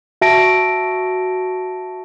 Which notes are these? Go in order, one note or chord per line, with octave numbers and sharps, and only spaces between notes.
F#4 E5 A5 A#6 D7